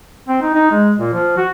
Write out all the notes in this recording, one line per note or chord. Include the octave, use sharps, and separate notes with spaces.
C4
D#4
D#4
G#3
A#2
F3
F#4